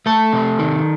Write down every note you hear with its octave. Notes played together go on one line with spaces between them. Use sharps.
A3 A4
C3
D#3